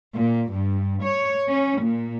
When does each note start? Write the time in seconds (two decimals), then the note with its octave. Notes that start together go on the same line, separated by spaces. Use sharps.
0.16 A#2
0.52 G2
1.03 C#5
1.48 C#4
1.81 A#2